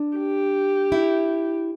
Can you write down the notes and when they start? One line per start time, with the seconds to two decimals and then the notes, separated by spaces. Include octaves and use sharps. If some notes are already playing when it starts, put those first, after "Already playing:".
Already playing: D4
0.17 G4
0.92 E4